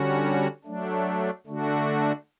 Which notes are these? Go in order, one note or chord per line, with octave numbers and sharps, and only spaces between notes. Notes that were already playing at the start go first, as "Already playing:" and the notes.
Already playing: D3 G3 C#4 F#4
F#3 A3 D4
D3 A3 D4 F#4